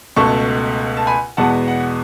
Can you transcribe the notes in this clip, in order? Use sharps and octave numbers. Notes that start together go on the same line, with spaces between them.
C#2 B2 A3 A5 C#6
A5
G#5 B5
E2 B2 G#3 B3 F#5 A5
F#5